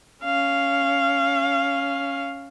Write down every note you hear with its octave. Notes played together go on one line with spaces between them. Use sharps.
C#4 F5